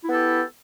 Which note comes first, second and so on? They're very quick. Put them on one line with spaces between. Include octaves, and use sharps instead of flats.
E4 B3 A4 G4